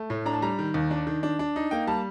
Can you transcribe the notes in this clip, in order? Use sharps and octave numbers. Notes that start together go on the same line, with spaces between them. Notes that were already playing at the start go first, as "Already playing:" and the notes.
Already playing: A3
A2
D4 A#5
A5
G3 A#5
D#3
D#2
D4
D#3
D4
D4
D#4
A#3 G5
G3 A5